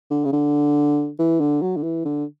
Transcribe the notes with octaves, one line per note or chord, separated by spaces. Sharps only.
D3
C#3
D3
E3
D3
F#3
D3
E3
D3